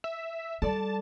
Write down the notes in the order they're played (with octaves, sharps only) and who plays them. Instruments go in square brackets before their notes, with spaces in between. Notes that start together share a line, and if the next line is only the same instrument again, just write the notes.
[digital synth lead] E5
[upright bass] G3 [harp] A4 D5 D6 [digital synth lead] A5